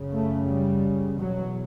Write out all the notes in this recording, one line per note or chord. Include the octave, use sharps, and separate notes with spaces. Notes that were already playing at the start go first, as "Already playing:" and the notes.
Already playing: F#2 C#3
A3
G3
E2 B2 F#3